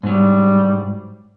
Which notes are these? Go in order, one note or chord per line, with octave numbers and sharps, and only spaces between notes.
G#2 F#3 G3